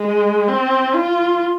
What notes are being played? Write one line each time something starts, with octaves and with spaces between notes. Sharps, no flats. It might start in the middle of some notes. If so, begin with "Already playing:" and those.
Already playing: G#3
C4
F4